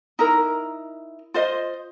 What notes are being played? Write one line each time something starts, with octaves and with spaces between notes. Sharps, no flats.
D#4 E4 A#4
F4 C5 D#5